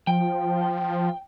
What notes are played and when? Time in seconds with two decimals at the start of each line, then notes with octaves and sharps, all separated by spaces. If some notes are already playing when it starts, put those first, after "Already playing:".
0.07 F3 G5